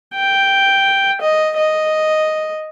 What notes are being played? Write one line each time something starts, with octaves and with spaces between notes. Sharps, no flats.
G5
D#5
D#5